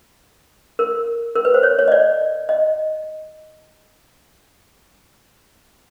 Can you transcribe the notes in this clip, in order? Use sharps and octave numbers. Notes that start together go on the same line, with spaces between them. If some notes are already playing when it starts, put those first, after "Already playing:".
A#4
A#4
B4
C5
C#5
C#5
D#5
D5
D#5